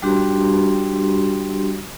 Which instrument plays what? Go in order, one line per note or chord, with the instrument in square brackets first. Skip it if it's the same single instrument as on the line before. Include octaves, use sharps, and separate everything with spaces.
[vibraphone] G3 D4 F#4 G4 C6